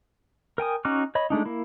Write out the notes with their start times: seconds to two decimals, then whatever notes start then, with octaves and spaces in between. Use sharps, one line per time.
0.58 A#4 G5 G#5 D#6
0.85 C#4 D#4 F#4 D6 F6
1.15 C#5 D#5 B5
1.30 G#3 A3 D4 D#4
1.45 A#3 E4